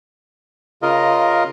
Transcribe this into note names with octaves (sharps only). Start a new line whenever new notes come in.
C#3 F4 A#4 D#5